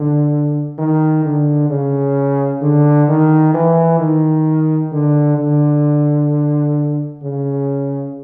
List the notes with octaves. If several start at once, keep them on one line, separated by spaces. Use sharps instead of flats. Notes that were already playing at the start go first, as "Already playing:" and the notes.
Already playing: D3
D#3
D3
C#3
D3
D#3
E3
D#3
D3
D3
C#3